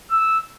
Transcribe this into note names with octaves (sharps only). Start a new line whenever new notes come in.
E6